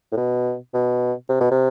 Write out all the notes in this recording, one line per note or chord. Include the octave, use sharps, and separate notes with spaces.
A2
B2
B2
C3
B2
C3